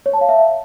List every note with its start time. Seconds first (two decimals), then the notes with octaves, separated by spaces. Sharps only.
0.06 C#5
0.13 A5
0.21 F5
0.29 E5